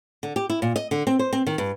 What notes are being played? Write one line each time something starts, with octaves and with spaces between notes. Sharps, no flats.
D3
G4
E4
A#2
D#5
D3
C4
C5
C4
D#3
G2